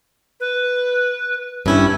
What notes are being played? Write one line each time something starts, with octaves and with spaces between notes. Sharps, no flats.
B4
G2 C#4 E4 G5